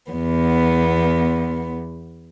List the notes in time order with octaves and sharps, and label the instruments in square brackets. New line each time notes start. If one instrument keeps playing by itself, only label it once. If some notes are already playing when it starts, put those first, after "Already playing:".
[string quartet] E2 B3